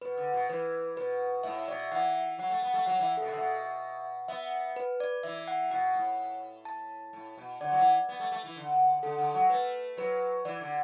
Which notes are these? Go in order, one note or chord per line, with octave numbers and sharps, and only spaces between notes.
B2 B4
D3
B2
E3 B4
B2 B4
A2 E5
E5
B2 D5
E5
E3 F#5
F#3 F#5
A3
B3
A3
F#3 F#5
E3 E5
A4
B2
D3 F#5
B2 E5
B3 E5
B4
D5
E3 E5
F#5
B2 F#5
A2
A5
A2
B2
D3 D5
F#3
E3
B3
A3
A3
E3
D3
D3 A4
D3
F#3
A3 B4
F#3 B4
E3 D5
D3